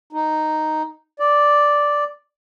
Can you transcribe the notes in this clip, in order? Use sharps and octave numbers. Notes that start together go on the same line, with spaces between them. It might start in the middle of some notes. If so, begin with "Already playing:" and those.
D#4
D5